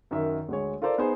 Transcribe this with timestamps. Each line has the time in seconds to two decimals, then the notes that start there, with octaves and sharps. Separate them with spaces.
0.11 F#2 D#3 E5
0.49 D2 G#3 C#5
0.82 F4 A4 A#4 C5 D5
0.98 B3 D#4 G#4 C5